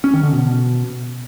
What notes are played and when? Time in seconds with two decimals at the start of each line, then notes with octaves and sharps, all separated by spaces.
0.04 C#4
0.14 D#3
0.23 D3
0.33 B2